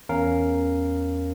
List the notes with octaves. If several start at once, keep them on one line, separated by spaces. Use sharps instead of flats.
E2 C#4 A#4 F5